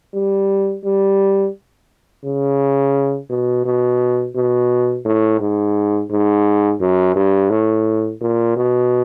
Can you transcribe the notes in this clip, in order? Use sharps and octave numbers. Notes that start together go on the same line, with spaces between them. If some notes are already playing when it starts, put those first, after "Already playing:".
G3
G3
C#3
B2
B2
B2
A2
G#2
G#2
F#2
G2
A2
A#2
B2